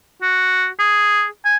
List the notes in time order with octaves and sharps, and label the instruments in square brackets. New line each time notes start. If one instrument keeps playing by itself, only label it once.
[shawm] F#4
G#4
G#5